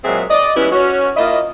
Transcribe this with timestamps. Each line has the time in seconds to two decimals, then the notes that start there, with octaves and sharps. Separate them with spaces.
0.04 A#2 F#3 G#3 C4 G#4 E5
0.29 D5 D#5
0.56 E3 G3 G#3 B3 C#4 E4
0.72 C#4 F#4
1.16 A#3 E4 F4 D#5